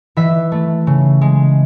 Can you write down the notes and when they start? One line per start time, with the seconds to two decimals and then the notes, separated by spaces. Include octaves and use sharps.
0.17 E3 E5
0.52 A3
0.87 C#3
1.22 G#3